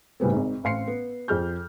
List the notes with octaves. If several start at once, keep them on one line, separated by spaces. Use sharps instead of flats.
A2 C#3 G3 B3 C4
G#1 G#2
A1 C4 F5 C6 C7 C#7
B3
F2 G#4 F6 G6